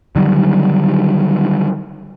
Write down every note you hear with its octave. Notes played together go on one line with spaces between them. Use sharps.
D3 D#3 F#3 G3